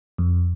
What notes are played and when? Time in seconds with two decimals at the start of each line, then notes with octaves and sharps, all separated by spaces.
0.18 F2